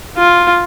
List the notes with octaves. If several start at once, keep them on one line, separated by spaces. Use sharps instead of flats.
F4